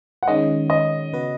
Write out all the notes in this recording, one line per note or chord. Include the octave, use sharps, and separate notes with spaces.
F#5
D#3 G#3 C#4 D#5
D#5
C#3 B3 F#4 B4